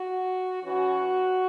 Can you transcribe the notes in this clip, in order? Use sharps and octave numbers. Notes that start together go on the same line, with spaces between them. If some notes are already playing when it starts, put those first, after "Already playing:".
Already playing: F#4
E3 C#4 F#4